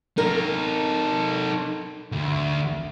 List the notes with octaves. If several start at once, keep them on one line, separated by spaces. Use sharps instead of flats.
D#4 A4 A#4
D2